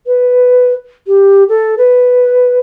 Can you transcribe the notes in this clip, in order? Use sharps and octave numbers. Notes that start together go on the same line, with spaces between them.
B4
G4
A4
B4